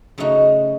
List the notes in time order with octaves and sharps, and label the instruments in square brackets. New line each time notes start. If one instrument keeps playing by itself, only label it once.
[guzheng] C#3 F#3 A3 D#4 F#4